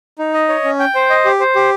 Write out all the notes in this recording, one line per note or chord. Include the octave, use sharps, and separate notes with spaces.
D#4
D#5
C#5
C#4
G5
C5
D#5
G4
C5
G4